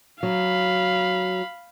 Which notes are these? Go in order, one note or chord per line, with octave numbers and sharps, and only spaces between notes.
F#3 F5 B5